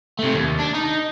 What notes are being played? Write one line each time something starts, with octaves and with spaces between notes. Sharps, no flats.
C3 A3
D#2
D4
D#4